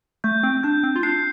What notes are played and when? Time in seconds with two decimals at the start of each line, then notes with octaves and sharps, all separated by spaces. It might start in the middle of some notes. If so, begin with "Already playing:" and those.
0.24 A3 G6
0.43 C4
0.63 D4 G6
0.83 C4
0.96 F4
1.03 D4 C7